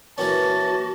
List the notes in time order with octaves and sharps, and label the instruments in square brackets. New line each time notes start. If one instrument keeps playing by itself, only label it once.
[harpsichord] E3 A#3 C#4 [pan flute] F#4 [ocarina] B4 [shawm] A5